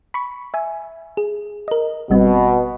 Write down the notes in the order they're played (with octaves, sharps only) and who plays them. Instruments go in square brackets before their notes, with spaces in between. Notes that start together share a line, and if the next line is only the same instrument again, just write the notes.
[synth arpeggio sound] B5 C#6
E5 G#5
G#4
A#4 D#5
[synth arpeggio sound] G#1 G3 C4 [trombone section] B2